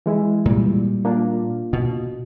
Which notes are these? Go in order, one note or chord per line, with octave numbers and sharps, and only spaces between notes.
E3 G#3 E4
A#2 G3
A#3 D4 F4
B2